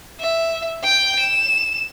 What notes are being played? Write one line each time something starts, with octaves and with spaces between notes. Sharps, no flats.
E5
G5 G6
E7